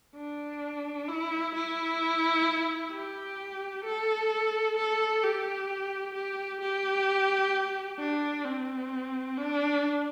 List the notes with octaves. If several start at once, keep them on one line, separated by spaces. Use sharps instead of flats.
D4
E4
E4
G4
A4
A4
G4
G4
G4
D4
C4
D4